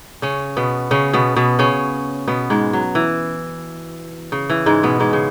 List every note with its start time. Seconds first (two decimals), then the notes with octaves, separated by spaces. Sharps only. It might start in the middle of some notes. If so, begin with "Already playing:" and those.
0.22 C#3 C#4
0.57 B2 B3
0.91 C#3 C#4
1.13 B2 B3
1.36 B2 B3
1.59 C#3 C#4
2.28 B2 B3
2.50 G#2 G#3
2.73 F#3
2.95 E3
4.32 C#3
4.50 E3
4.66 G#2 G#3
4.83 B2 B3
5.00 G#2 G#3
5.13 C#3